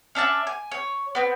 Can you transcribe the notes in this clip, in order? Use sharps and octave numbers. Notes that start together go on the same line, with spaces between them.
C#4 D4 E5 A5
G#5
C#5
B3 C4